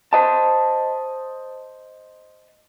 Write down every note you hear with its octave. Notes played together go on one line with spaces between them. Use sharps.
C5 D#5 A5